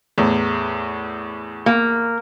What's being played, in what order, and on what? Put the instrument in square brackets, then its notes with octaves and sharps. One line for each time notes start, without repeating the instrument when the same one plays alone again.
[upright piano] E2 A2
[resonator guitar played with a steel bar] A#3